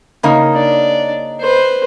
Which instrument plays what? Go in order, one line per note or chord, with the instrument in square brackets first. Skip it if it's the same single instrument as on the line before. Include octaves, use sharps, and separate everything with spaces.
[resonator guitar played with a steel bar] C#3 A#3 D#4
[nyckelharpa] D4 D5
B4 C5